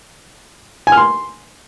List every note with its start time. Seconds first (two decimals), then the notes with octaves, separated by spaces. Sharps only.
0.87 G#5
0.92 F6
0.97 C6